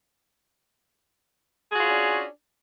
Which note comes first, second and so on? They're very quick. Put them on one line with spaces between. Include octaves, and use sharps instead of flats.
G#4 F#4 F4 C#4 D4